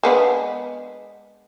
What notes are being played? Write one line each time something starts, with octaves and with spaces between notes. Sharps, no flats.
G#3 B3 D4